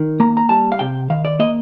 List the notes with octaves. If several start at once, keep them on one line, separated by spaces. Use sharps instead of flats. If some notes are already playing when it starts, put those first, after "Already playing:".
Already playing: D#3
A#3 A#5
A#5
G3 A5
F5
C3 G5
D#3 F5
D5
A#3 D#5